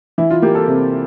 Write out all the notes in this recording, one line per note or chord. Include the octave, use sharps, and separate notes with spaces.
E3 E4
F4
A#3 G4
A4
C3